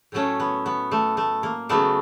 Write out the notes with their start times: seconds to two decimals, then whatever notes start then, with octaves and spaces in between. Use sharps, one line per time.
0.12 A2 F#3 A3 C#4
0.40 B3
0.66 B3
0.91 A3
1.17 A3
1.43 A#3
1.69 C#3 F#3 A3 B3